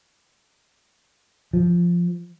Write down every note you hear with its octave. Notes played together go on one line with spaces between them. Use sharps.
F3